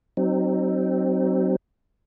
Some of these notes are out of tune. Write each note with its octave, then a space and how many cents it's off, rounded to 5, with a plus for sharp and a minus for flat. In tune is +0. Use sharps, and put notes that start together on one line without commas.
F#3 +30 C4 +0 D#4 -20